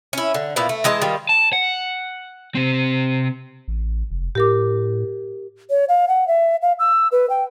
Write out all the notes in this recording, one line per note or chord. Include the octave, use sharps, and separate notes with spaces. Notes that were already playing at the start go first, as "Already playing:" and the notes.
C#4 E4
D3
A#2 B3 E4 F5
A3
E3 G#3 D#5 A5
D#3 G3 F4
A5
F#5
C3 C4
A1
F1
A2 G4 A#4 D6
C#5
F5
F#5
E5
F5
E6
B4
G5